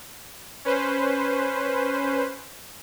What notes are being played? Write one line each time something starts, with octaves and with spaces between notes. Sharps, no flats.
C#4 B4 C5